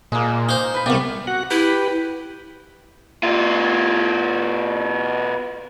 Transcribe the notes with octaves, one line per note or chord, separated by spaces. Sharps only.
A#2 G#3 A#3
D#4 C5
B4 B5
C2 C3 B3 D5 F5
F#4 F#5
E4 G4 B4
B2 F4